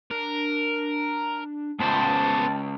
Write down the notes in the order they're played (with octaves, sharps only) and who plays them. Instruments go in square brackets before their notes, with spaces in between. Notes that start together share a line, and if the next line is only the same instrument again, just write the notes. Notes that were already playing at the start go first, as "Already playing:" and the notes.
[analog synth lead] D4 [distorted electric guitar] A#4
[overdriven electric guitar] C#2 [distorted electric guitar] B3 C5 [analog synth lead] G5 [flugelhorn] A5